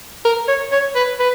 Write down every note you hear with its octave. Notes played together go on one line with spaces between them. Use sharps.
A#4
C#5
C#5
B4
B4